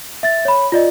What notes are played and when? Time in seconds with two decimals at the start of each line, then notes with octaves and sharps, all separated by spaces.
0.23 E5 A6
0.45 C#5 B5
0.72 F4 D5 D#5